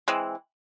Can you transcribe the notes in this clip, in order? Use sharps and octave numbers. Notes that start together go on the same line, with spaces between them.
E3 G#3 C4